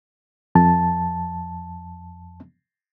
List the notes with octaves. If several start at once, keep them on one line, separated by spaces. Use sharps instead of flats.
F2 A5